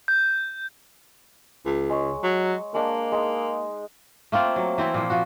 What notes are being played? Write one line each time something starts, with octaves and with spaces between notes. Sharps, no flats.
G6
C#2
G#3 C#5
F#3
G#3 A#3 D4
G#3 D#4
A3 A#3 C4 F4
F#3
E3 C4 E4
A#2 F3 A#3
F3 F#4